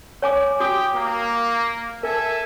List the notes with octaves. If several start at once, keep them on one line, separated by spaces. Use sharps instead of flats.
C#5 G#5 D6
F#4 G4 G5 D6 D#6
A#3
A4 A#4 E5 G#5